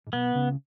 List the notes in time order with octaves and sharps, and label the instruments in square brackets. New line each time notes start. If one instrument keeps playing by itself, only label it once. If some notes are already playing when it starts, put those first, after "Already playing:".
[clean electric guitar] G#2
[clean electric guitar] B1 B2 [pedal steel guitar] B3
[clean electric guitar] C#2 C#3